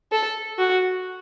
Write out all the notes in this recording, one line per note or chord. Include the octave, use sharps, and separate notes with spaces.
A4
F#4